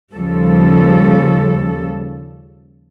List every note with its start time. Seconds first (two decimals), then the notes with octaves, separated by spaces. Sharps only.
0.14 D#2 C#3 F3 G3 A4